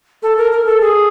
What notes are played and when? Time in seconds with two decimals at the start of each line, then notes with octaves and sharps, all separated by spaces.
0.23 A4
0.37 A#4
0.52 A#4
0.66 A4
0.81 G#4